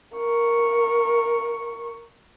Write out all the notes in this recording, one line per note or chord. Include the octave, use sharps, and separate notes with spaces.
A#4 C#6